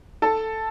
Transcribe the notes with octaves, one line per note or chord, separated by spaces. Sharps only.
A4 A5